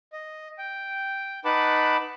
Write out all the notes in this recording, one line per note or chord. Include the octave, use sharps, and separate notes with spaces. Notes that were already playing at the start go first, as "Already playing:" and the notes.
D#5
G5
D#4 B4 F#5 A5 B5 D6